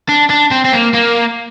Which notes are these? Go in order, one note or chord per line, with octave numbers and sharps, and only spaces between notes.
D4
D4
C4
C4
A#3
A#3